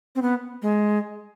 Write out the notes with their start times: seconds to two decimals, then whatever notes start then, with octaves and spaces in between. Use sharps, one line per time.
0.16 C4
0.22 B3
0.62 G#3